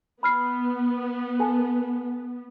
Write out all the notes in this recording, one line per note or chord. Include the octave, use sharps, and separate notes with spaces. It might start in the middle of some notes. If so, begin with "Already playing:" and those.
B3 B5 F6 C7
A4 G#5 A5